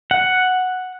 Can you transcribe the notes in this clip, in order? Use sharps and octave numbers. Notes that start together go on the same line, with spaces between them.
F#5